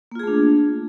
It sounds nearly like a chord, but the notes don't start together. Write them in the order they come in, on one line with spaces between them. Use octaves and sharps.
A#3 F4 G#4 A3 D4